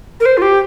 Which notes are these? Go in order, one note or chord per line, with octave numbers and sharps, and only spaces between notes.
A#4
C5
F4
G4